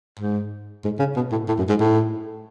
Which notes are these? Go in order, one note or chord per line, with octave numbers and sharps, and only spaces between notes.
G#2
G#2
C#3
B2
A2
A2
F#2
G#2
A2